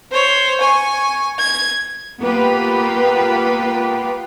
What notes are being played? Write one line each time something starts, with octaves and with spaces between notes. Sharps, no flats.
C5 C#5
G#5 C#6
G#6
A#3 B3 F4 G4 B4